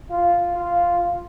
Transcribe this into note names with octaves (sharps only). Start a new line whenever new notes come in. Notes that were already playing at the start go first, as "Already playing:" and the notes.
F4
F4